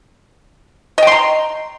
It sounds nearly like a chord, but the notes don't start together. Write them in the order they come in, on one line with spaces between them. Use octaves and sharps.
D#5 G5 C6 A#5